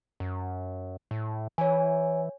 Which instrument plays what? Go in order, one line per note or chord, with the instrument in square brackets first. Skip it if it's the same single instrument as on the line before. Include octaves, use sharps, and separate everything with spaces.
[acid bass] F#2
A2
[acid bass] E3 [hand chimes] C#5 G#5